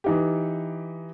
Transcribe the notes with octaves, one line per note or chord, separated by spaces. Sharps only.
E3 D#4 G4